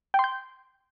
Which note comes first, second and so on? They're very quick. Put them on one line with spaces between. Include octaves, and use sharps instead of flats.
G5 C6 G6